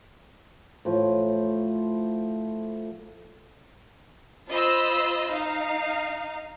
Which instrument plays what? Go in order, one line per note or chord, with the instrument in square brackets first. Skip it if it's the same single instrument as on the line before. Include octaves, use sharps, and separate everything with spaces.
[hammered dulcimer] A2 F3
[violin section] F4 C5 D#5 B5 E6
D#4 F5